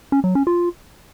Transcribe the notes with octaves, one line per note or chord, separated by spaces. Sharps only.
C#4
F#3
C#4
F4